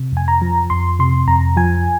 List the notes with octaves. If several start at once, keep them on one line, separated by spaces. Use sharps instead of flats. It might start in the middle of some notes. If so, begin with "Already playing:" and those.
Already playing: C3
F2 G#5
A#5
F3
F2 C6
C3 C6
F2 A#5
F3 G#5